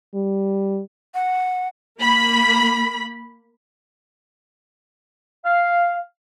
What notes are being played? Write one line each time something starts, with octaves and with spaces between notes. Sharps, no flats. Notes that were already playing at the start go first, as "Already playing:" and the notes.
G3
F#5
A#3 B5
F5